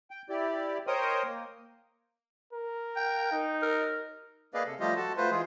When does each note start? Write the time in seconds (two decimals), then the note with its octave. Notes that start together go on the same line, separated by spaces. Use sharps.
0.11 G5
0.29 E4 G4 D5
0.87 A#4 C5 C#5 D#5 G5 D#6
1.24 A#3
2.53 A#4
2.97 G5
3.32 D#4
3.62 A#4
4.54 A#3 G#4 B4 D5 D#5 F5
4.66 C3 A4
4.80 F3 G3 A3 F4 G4 D#5
4.96 F#4 A4 A5
5.17 A3 F4 B4 C5
5.31 E3 G#3 F4 G#4